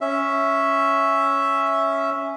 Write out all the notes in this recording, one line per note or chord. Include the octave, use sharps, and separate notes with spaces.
C#4 E5